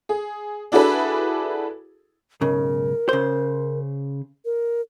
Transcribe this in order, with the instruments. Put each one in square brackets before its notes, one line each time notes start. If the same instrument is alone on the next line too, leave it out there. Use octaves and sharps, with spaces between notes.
[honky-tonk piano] G#4
D4 E4 F#4 G#4 A4 B4
[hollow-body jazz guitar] B1 G#2 C#3 [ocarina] A#4
[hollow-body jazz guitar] C#3 C5
[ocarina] A#4